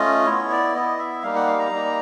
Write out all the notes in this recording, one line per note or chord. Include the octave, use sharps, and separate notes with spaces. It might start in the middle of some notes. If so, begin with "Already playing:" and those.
Already playing: A3 C#4 F4 D#5
B3 E4 C#5
D5
B3 E4 D#5
E5
G3 A#3 D#4 F5
F#5
F5
A#5
G3 A#3 D#4